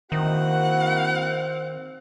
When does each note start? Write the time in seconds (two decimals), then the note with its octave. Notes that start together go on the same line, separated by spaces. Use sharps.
0.12 D#3 A#3 C4 E4 F#4 F#5